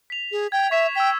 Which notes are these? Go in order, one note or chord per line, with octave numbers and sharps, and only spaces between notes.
B6 F7
G#4
G5 G#6
E5 C#6 B6 E7
G5 E6 B6